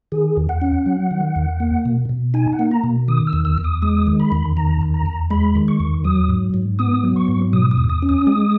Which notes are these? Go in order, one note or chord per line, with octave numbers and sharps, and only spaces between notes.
D#3 G#4
E2
F#5
C#4
F#3
D#3
E2
A#3
B2
B2
D#4 G#5
F#5
A#3
A#5
B2
D#3 D#6
E6
E2
E6
E2
D#6
G#3 D#6
D#3
B5
E2
D#3 A#5
E2
A#5
E2
G#3 B5
D#3
C#6
E2
F#3 D#6
G#2
G#2
B3 D#6
F#3
C#6
G#2
B2 D#6
D#6
E2
D#6
C#4
D#6
G#3 D#6